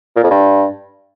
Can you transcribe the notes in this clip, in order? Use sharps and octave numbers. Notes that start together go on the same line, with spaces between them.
A#2
F2
G2